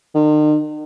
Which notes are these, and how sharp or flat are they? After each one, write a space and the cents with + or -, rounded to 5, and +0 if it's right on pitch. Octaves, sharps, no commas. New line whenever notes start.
D#3 -45